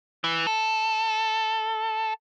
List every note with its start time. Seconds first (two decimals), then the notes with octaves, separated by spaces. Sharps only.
0.24 E3
0.47 A4